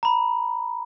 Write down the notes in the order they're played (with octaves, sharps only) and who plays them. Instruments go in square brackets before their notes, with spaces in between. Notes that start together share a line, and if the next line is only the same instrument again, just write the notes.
[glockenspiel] A#5 B5